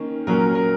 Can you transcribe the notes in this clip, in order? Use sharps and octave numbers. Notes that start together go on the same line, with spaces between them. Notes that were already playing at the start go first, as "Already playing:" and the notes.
Already playing: D#3 A#3 C#4
A#2 F#3 A#3 C#4 A#4
A#4